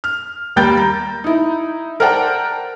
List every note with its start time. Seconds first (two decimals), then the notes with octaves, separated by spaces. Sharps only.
0.04 F6
0.56 D#2 G3 A#3 G5 G6 A6
0.77 A#5
1.24 D#4 E4
2.00 A#4 C5 D5 F#5 G5 A5